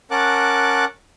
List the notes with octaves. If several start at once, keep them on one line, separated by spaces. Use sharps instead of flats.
C#4 A#4 F#5 A5 D6 F#6